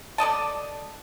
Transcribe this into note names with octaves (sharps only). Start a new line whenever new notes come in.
A4 D5 D#5 A5